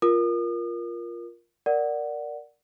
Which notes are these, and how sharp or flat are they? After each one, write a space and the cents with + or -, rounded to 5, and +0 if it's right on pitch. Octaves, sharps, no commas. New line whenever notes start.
F4 +0 A#4 +10 D#6 -40
A#4 +0 D5 +0 F#5 +0